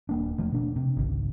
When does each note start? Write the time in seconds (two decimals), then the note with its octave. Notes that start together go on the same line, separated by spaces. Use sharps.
0.09 D#1 A#3 D4
0.38 E1 F3 A3
0.52 B2 D4
0.76 C3
0.97 G#1 C#2